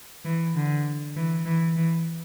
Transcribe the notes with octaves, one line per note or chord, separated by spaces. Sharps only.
E3
D3
E3
E3
E3